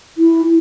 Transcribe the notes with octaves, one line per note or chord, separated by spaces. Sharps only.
E4